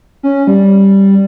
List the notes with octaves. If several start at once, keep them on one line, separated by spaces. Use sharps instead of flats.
C#4
G3